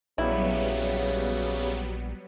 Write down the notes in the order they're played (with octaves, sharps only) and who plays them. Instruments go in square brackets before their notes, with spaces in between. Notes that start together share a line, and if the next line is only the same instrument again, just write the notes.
[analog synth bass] A#1 [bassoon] C#3 [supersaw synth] F#3 G3 B3 [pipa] E4